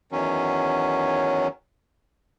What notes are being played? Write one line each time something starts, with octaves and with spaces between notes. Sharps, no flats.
E2 D#3 F#3 C#4